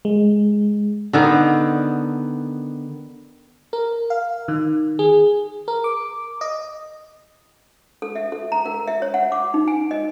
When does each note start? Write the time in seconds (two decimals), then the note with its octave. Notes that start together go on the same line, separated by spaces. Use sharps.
0.05 G#3
1.13 D3 D#3 B3
3.73 A#4
4.10 F5
4.48 D#3
4.99 G#4
5.68 A#4
5.84 D6
6.41 D#5
8.02 A4
8.16 E5
8.32 A4
8.52 A#5
8.66 A#4
8.88 E5
9.02 C#5
9.14 F#5
9.32 D6
9.54 D#4
9.68 G#5
9.91 D#5